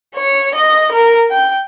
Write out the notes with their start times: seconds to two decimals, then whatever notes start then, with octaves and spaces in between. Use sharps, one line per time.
0.15 C#5
0.55 D#5
0.92 A#4
1.31 G5